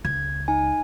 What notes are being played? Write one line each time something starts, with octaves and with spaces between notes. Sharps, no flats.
C#2 G#6
D#4 G#5